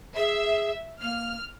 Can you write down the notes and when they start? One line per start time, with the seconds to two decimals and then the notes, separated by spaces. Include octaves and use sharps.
0.16 G#4 E5
1.01 A#3 F6